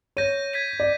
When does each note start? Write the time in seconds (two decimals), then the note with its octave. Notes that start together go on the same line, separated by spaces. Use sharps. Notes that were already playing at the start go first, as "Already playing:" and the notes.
0.17 C#5 G6 A#6 D#7
0.53 G#6 B6 D#7
0.80 D5